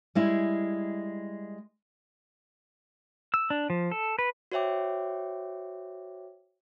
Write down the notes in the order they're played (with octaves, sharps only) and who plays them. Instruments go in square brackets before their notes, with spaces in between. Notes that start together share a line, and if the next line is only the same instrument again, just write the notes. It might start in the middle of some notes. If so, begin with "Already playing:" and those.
[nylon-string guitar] G3 G#3 E4
[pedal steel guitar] E6
D4
F3
A4
B4
[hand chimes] F#4 C5 C#5 E5 G5 D6